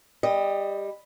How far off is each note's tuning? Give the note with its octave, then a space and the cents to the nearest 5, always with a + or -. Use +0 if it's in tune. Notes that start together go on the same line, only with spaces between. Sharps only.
G3 +15 D#5 +0